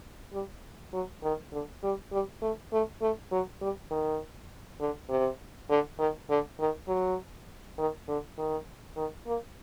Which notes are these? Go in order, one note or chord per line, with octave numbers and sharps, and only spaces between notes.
G3
F#3
D#3
D3
G3
G3
A3
A3
A3
F#3
G3
D#3
D3
C3
D3
D#3
D3
D#3
F#3
D#3
D3
D#3
D#3
A#3